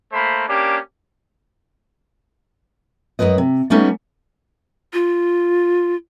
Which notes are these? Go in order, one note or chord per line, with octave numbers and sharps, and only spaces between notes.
A3 A#3 C5 B5
A#3 C#4 D4 G4
F#2 B2 G#3 B4 D#5
C3
G3 A3 B3 C#4 D#4
F4